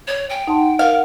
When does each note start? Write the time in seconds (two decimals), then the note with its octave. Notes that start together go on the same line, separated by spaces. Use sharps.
0.07 C#5
0.29 G5
0.47 D#4 F#5 A5 C6
0.79 A#4 F5